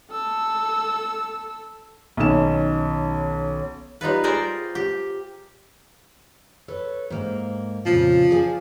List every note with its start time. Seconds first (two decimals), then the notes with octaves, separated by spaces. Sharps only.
0.11 A4 E6
2.17 B1 D#3 C#4 E7
4.01 G3 D#4 F4 B4
4.24 G#4 A#4 C5 D5 G5
4.75 G4
6.68 A4 B4 C#5
7.10 G#2 A#3
7.86 F2 A#2 C#3 F3
8.31 G#4 D5 G#5